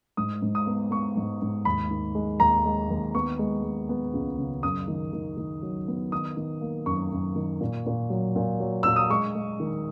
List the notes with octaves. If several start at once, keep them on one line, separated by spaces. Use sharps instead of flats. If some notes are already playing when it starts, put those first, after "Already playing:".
G#2 D#6
G#2
D#6
B3
B3 C#6
G#2
G#2
D#2 B5
D#3
G#3
D#2 A#5
G#3
D#2
B3 C#6
G#3
G#3
B3
C#2
C#3
F#2 D#6
D#3
D#3
D#3
F#3
B3
D#3 D#6
D#3
A#3
F#2 C#6
F#2
D#3
A#2
A#2
F#3
A#2
F#3
A#2 E6
D#6
G#3 C#6
G#3
D#3